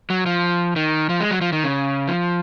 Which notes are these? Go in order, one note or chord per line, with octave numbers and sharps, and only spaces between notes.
F#3
F3
D#3
F3
G#3
F#3
F3
D#3
C#3
F3